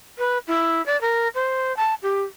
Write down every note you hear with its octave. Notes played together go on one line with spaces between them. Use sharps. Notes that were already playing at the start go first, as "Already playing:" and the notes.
B4
E4
D5
A#4
C5
A5
G4